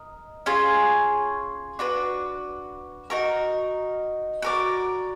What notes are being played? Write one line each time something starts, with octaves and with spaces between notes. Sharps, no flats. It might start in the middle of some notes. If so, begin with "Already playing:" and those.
Already playing: A#4 D#5
C#4 F4 G#4
D4 F#4 B4
D#4 F#4 A#4
F#4 A#4 D5